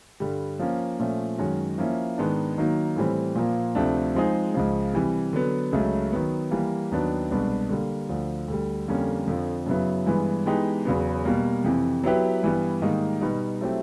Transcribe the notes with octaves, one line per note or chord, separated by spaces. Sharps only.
G2 D3 G3
F3 A#3 C#4
A#2 F3 A3 C#4
F#2 D#3 G#3 C#4 F#4
F3 A#3 C#4 E4
G#2 D#3 G#3 B3 D4
D#3 F#3 A#3 D#4
A2 E3 G3 C4
A#2 F3 A#3
D2 C3 F3 A3 D4
F3 G#3 C4 D#4 G#4
C#2 C#3 F3
C3 E3 G3
D3 F#3 B3
C#2 C#3 F#3 A3
D#3 F#3 B3
E3 G3 A#3
D#2 D#3 F#3 B3 D4
C2 B2 G#3 B3 D4
D3 G3 A#3
D2 D3 F3
D2 D3 G3
F2 D3 G3 A#3 C#4
F2 D3 F3
F#2 C#3 F#3 B3 E4
G2 E3 G#3 B3
E3 G#3 B3 D#4 G4
E2 C#3 F#3 B3
B2 G3 A#3
F2 C3 E3
F#3 B3 E4 G4 B4
G2 E3 G3 B3
G#2 D#3 G3 A#3 D#4
B2 G3 B3 D#4
F#3 A3 C4 E4 G4